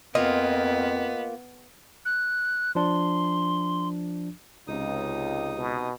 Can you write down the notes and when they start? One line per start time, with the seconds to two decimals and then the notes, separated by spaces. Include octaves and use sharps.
0.15 F2 A#3 B3 F4 D#5
2.05 F#6
2.75 F3 D4 C6
4.67 C#2 C3 D#4 D#6
5.56 B2